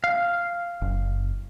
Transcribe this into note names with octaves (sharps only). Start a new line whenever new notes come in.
F5
F#1